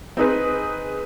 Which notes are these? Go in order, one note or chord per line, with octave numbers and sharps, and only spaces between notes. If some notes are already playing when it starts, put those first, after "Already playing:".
C4 D#4 G#4 B4